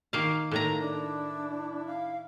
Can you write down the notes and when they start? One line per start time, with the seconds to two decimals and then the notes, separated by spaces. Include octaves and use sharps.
0.13 D#3 A#3 F5
0.51 A2 D#3 A#3 A#5
0.80 D4 E4
1.86 F5